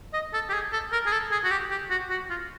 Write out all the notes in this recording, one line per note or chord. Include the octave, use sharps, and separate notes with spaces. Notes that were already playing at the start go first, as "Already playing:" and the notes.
D#5
A4
G4
G#4
A4
A#4
G#4
A4
G#4
F#4
G4
G4
F#4
F#4
F4